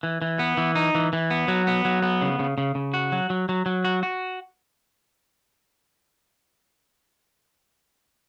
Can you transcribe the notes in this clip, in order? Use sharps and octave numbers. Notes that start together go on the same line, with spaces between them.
E3
E3
B3
E3
D#4
E3
E3
B3
F#3
B3
F#3
B3
C#3
C#3
C#3
C#3
F#4
F#3
F#3
F#3
F#3
F#4
F#4